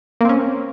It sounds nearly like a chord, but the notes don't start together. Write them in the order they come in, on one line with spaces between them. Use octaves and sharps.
A#3 C4 C#4